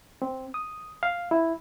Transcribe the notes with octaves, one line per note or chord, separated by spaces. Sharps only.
C4
D#6
F5
E4